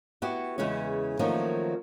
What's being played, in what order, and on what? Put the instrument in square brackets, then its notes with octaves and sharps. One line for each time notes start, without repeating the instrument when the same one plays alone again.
[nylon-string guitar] B3 E4 F#4 G4
E2 C#3 E3 G#3 C#4
D#3 F3 F#3 A3 A#3 C#4